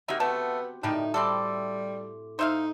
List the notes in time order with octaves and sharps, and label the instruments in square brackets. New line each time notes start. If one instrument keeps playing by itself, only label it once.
[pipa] A#3 D#4 [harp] C4 F#4 G4 [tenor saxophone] E5
[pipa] A3 A5 [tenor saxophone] B3
[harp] A2 [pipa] D#3 G3 D4 [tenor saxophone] D#4
[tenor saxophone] G3 [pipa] C4 E4 A4 [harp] C6 D6
[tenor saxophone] D#4 [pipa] C5 E5 F5